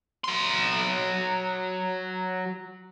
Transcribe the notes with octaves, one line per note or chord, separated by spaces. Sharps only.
F#3 C6